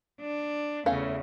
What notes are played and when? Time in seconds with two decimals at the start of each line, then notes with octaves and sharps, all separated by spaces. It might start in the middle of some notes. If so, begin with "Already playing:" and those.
0.19 D4
0.86 E2 C#3 A3 C#4 F5